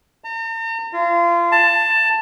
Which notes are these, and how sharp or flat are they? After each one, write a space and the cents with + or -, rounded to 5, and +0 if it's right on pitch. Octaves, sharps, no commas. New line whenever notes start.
A#5 -45
F4 -30
A5 +15